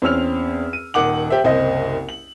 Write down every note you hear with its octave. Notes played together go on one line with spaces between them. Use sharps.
E2 C4 C#4 E6 F6 F7
D#7
D#1 D#3 F#5 D6 F#7
G4 C5 E5
F#1 C2 C5 D#5
F#7